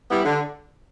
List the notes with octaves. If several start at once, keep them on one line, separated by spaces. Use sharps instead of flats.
G3 B3 E4 G4
D3